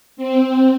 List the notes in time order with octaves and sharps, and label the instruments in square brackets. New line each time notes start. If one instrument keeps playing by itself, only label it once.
[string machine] C4